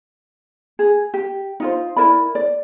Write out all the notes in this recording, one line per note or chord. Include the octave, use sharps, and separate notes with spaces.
G#4
G4
D#4 F4 C5
E4 A#4 D5 B5
D5